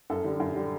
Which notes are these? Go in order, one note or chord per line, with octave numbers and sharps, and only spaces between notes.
F#2 A4
D3 G3
F#2
D3 G3